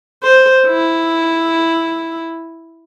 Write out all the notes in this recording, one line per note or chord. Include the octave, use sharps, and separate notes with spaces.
C5
E4